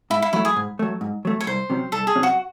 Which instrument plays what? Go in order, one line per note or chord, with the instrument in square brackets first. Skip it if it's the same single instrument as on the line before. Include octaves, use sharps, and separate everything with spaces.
[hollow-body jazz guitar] G#2 [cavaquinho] E4
[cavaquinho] E4
[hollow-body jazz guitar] F#3 A3 [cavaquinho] E4
[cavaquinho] G#4
[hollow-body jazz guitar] G#2
F#3 A3
G#2
F#3 A3
[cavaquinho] C#5
[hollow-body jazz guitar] C2 [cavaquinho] C5
[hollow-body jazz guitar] C3 F#3 C#4
[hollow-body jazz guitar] C2 [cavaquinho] A4
[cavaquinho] G#4
[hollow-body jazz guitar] C3 F#3 C#4
[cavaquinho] F#4